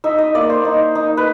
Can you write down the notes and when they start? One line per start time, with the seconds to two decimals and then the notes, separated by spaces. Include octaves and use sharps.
0.04 D#4 E5
0.18 D#5
0.35 A#3 D5
0.50 C5
0.65 D#4
0.95 D#4
1.17 B4